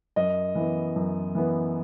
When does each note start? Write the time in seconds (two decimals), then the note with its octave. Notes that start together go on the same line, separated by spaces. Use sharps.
0.16 F#2 D#5
0.55 E3
0.61 B3
0.96 F#2
1.35 E3 B3